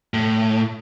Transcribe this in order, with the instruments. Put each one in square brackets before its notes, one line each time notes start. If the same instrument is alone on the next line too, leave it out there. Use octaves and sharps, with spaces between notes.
[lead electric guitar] A2